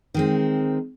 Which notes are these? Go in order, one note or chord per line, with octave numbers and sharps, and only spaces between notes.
D#3 G#3 C4